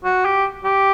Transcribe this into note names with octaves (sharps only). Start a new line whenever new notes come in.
F#4
G4
G4